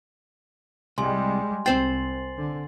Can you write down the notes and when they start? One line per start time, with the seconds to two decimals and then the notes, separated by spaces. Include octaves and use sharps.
0.98 C2 G3 G#3 G#5 C6
1.66 C2 C4 C5 G5 A6 C7 F#7
2.36 D3